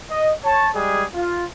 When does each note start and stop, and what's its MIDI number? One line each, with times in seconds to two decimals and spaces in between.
0.10 0.32 75
0.43 0.69 73
0.43 0.69 81
0.74 1.05 55
0.74 1.05 56
0.74 1.05 68
1.14 1.46 65